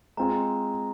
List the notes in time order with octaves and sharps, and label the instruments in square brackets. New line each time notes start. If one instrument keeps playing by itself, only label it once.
[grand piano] G#3 C4 F4 G#4 [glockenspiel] A#5